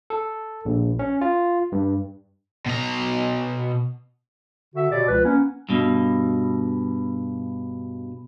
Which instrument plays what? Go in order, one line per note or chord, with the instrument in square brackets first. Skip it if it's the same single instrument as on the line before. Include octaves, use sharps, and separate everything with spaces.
[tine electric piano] A4
A#1
C#4
F4
G2
[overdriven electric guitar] B2 A#5
[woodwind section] D3 F#4 E5
B2 G4 C#5 D5
C#2 F3 B4
A#3 B3 C#4
[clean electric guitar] G2 B2